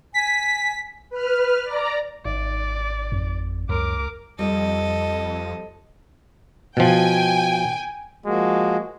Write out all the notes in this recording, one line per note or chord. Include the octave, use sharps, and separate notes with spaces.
G#5 B6
B4 F6
D5 A#5
G#1 D5
F2
C#2 F#2 A#4 D6
F2 G3 A4 D#5
B2 F3 G5 G#5
F3 G#3 A#3 F#4